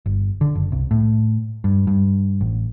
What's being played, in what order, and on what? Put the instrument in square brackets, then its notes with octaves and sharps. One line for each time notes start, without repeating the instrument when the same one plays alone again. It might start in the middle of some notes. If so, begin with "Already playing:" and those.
[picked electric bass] G1
D3
F#1
C2
A2
G2
G2
A1